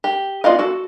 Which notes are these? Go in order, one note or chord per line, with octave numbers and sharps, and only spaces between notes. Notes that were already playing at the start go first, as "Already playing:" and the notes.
G4
B3 F4 D5 D#5 F5
F#4 A4